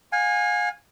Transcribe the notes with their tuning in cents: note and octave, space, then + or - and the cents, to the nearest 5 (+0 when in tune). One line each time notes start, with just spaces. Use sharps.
F5 +40 G#5 -15